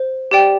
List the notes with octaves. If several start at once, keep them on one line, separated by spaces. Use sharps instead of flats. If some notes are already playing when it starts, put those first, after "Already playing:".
Already playing: C5
G4 D5 G5